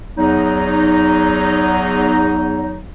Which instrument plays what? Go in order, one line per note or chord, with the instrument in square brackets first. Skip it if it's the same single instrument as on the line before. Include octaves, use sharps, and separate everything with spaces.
[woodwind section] E2 F#3 D#4